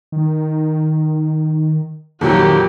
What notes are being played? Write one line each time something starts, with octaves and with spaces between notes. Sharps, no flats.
D#3
F2 A#2 D#3 F#3 F#4 G4